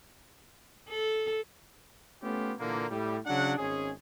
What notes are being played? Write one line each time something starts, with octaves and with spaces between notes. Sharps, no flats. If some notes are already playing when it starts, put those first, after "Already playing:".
A4
A3 B3 C#4 F4 G4
A#2 D3 E3 A#3
A2 G3
C#3 F#3 D4 F#5
G#1 G#3 C#4 G#4